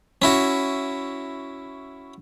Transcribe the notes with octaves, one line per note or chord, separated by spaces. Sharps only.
C#4 E4 F#4